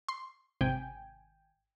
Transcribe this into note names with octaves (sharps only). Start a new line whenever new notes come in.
C6
G#1 C3 G5 G#5